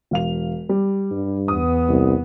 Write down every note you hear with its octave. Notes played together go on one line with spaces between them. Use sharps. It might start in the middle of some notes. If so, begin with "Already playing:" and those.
E1 F5 F7
G3
G2
E2 B3 D#6
C2